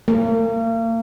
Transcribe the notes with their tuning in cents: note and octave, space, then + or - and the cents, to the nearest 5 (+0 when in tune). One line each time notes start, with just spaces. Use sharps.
A#3 -40